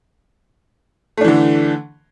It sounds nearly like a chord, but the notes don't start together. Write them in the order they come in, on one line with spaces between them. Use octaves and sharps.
A3 D4 E3 D3